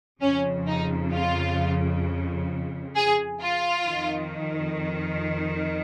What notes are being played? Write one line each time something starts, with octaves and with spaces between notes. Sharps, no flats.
F2 C#3 C#4
D#4
F4
G#4
F4
F2 D#3